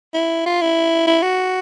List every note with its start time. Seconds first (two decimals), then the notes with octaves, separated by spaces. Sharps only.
0.14 E4
0.46 F4
0.61 E4
1.07 E4
1.23 F#4